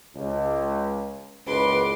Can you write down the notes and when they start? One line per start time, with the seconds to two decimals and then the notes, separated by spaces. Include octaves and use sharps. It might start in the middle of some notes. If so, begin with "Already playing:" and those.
0.15 C#2
1.46 F#1 C#2 B4 C6 D6